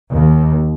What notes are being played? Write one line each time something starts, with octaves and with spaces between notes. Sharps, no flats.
D#2